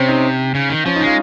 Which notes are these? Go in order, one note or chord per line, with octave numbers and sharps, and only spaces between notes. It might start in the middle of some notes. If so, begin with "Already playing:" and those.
Already playing: C3 C4 C#4
D#4
C#3
D#3
F3 C#4
G#3 D#4
F4